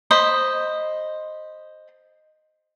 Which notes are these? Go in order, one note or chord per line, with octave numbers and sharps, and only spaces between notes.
C5 D#5 B5